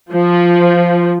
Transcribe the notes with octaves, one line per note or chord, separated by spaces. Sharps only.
F3